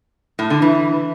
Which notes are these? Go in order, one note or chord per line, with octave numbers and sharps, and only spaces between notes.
A2
D3
E3